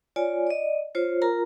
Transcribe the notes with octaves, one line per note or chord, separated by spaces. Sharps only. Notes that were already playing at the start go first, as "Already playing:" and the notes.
F4 C#5 D5 G#5
D5 D#5
F4 C5 C#5
F4 A#4 A#5